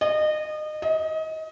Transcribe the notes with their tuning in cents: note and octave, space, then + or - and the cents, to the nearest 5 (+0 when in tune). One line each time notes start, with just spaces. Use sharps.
D#5 -30
D#5 +25